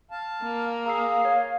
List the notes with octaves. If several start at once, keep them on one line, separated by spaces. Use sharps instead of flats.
F5 A5
A#3
G#4 F5 A#5 E6 C7
C#5 C7